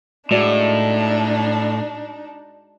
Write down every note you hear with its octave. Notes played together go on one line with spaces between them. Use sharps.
A2 G#3 D4 D#4 F#4 D5